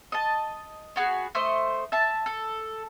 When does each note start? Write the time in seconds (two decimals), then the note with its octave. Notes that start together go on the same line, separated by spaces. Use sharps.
0.12 D#5 A5
0.96 B3 F#4 G#4
1.35 A3 C5 D#5
1.92 E5 A5
2.26 A4